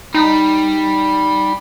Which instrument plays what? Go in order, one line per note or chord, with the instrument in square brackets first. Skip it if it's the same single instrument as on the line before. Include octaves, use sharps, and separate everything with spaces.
[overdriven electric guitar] G3 [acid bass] D#4